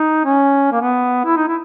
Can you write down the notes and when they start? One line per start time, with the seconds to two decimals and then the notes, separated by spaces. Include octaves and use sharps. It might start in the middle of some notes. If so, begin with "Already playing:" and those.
Already playing: D#4
0.25 C#4
0.72 A#3
0.81 B3
1.25 E4
1.37 D#4
1.48 E4